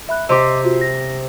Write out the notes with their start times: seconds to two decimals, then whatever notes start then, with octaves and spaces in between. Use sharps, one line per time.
0.09 E5 B5 F#6
0.29 C3 G4 D#5 C6 D6
0.64 F4 F#4
0.81 A#6